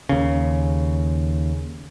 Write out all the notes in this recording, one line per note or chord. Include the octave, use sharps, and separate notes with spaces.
D#2 C#3